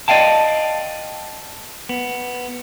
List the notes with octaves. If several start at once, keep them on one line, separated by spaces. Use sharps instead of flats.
D5 D#5 F5 G5 A5
B3